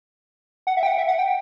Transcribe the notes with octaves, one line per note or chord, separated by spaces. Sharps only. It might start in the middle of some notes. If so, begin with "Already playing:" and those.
F#5
E5
G5
F#5
E5
F#5
G5